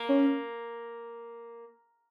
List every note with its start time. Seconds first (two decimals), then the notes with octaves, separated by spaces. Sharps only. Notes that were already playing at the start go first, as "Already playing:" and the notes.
Already playing: A#3
0.09 C#4